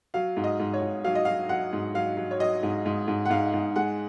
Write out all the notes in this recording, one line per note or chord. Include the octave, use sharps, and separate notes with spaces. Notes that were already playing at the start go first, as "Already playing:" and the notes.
F#3 F5
G#2
D#5
G#2
C#5
G#2
F#3 F5
D#5
F#3 F5
F#3 F#5
G#2
F#3 F5
F#3
C#5
F#3 D#5
G#2
G#2
G#2
F#5
G#2 F5
G#2
G#3 F#5